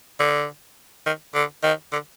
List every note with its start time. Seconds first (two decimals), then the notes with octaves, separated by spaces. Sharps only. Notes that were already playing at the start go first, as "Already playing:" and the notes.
0.20 D3
1.07 D#3
1.35 D3
1.64 D#3
1.92 D3